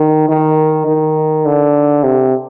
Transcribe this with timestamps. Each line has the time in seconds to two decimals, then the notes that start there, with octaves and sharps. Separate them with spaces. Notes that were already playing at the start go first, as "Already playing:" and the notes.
Already playing: D#3
0.29 D#3
0.87 D#3
1.46 D3
2.04 C3